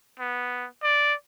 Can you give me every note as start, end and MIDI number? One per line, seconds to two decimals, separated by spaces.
0.20 0.67 59
0.83 1.14 74